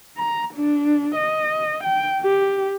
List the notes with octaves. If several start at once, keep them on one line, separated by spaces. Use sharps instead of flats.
A#5
D4
D#5
G5
G4